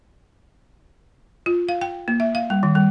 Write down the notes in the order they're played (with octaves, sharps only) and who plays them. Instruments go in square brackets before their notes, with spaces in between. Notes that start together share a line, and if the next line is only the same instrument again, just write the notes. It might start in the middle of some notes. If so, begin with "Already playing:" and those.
[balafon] F4
F5
G5
A#3
E5
F5
G3
D#3
G3